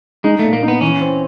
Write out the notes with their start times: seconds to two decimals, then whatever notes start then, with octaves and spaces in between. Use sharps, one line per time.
0.24 G#3 D#4
0.39 A#2 A3
0.53 A#3
0.63 D#4
0.68 B3
0.81 E3 C#4
1.01 C4